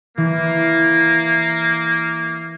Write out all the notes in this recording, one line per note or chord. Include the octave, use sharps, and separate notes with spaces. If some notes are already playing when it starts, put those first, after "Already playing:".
E3 A#3